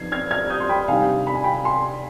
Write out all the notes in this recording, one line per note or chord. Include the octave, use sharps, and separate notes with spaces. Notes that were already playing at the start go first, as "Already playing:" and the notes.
Already playing: F3 B3 D#4 G#6 C7
F6 G#6
F6 G#6
D#6 G6
C6
G5 B5
C3 D#3 G3 D4 F5 G#5
B5
G#5
G5 B5
G#5 C6